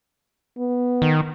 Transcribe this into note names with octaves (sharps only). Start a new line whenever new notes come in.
B3
D#3